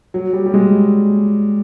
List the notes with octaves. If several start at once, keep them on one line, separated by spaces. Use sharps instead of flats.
F#3
G3
G3
G#3